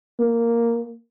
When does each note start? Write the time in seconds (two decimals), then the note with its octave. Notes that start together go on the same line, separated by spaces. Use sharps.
0.20 A#3